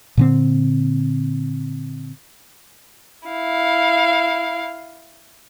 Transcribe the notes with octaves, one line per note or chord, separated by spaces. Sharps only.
A#2 D3 C4
E4 F5